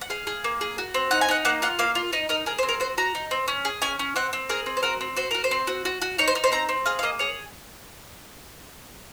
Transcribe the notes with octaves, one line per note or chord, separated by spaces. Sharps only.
F#5
G#4 F5
G#4
A#3
G#4
F#4
C4
D#4 F#5
G#5
D#4 F#5
A#3 F#5
F4 F#5
A#3 F5
F4
D#4 D#5
D#4 A#4
G#4 A#4
C5
C4
A#4
F#4 C5
F#4 A#5
D#4
C4
C#4
G#4
C#4 G#5
C#4
C4 F#5
C4
G#4 A#4
C4
C5
F#4 A#4
C4
F#4 C5
F#4 A#4
C5
C4
F#4
F#4
F#4
D#4 C#5
C5
D#4
C5
C4 A#5
C4
G#4 F5
F5
A#3 D#5
G#4 C#5